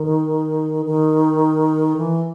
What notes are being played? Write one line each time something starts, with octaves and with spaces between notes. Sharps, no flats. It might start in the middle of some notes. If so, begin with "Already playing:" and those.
Already playing: D#3
D#3
E3